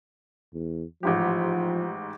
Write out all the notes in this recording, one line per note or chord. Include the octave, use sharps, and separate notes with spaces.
E2
A1 G#2 F3 G4